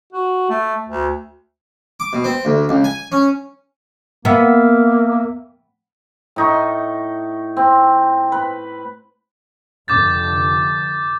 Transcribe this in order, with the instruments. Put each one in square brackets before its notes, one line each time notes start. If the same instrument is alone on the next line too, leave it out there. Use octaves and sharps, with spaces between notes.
[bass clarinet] F#4
A3
D2
[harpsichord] D6
B2
C4
D2
C#2
G#5
C#4
[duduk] A#3 [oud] B3 [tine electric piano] A#4 E5 F5
[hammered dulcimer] A2 D#4 C#6
C4
B4
[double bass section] F1 D3 [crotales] D6 G6 A6